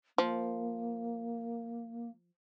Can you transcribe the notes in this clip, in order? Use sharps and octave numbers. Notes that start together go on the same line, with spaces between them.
F3 A#3